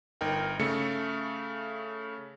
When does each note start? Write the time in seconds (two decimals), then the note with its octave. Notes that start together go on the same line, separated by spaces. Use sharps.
0.21 G1 D#4 A#4 G5
0.59 C#3 A3 C#7